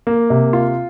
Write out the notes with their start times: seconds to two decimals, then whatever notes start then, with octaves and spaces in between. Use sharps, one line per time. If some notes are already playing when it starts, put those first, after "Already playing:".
0.07 A#3
0.30 C3
0.53 F4